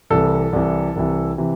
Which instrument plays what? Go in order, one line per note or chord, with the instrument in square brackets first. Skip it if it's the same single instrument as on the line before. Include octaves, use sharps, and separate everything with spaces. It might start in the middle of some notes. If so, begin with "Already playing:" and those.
[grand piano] C2 C3 E3 A4
C2 C3 E3
C2 C3 E3
C3 E3